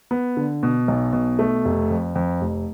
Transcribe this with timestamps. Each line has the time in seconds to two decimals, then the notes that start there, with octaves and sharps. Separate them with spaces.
0.11 B3
0.37 D3
0.63 B2
0.88 B1
1.13 B2
1.39 A3
1.65 F1
1.90 F2
2.15 F2
2.41 F1